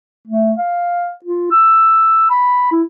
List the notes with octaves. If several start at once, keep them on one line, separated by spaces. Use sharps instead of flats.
A3
F5
F4
E6
B5
E4